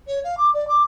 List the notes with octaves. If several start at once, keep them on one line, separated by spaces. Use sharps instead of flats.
C#5
F5
D6
D5
D6